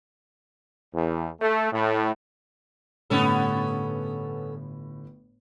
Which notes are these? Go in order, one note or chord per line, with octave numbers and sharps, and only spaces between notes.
E2
A3
A2
G1 A2 B3 C#4 A4